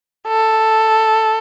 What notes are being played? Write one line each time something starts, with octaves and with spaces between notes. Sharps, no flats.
A4